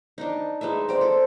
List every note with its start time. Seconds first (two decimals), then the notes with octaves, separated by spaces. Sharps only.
0.18 D4 D#4
0.61 G#3 D#4 B4 E5
0.89 C4 D5
1.01 A4